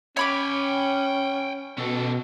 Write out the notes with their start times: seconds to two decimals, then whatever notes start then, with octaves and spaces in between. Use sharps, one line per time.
0.17 C#4 C#5 G5 G#5 B5 D6
1.78 B2 C#4 A4